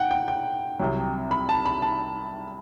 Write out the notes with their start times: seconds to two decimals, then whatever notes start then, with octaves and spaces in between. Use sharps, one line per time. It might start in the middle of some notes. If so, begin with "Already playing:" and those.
Already playing: F#5 G5
0.11 G5
0.28 G5
0.79 C2 C3 F#3
1.31 B5
1.49 A5
1.66 B5
1.82 A5